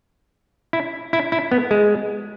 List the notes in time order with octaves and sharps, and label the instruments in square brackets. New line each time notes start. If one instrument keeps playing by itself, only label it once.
[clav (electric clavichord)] E4
E4
E4
B3
G#3